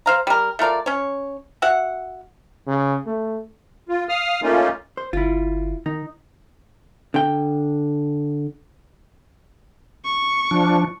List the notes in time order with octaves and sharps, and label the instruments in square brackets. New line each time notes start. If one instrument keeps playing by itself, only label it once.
[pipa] C5 F5 A#5
G3 A#4
A3 F4 A#4 D5
C#4 C#5
F#4 E5 F#5
[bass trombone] C#3
A3
[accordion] F4
F5 D#6 F6
A3 A#3 C#4 D#4 F4
[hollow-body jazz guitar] C5
[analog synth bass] G1 [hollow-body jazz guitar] E4 F4
[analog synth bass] D#3 [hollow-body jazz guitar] D#4
[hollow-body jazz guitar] D3 G5
[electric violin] C#6
[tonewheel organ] F3 D4